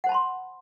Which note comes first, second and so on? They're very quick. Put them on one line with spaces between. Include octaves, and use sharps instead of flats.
F#5 C5 A5 B5 C6